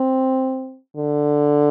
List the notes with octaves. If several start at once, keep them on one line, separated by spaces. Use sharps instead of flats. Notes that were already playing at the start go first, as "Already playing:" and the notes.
Already playing: C4
D3